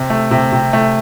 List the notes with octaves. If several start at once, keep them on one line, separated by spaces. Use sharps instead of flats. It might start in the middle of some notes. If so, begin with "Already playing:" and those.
Already playing: C3
A3
C3
C3
A3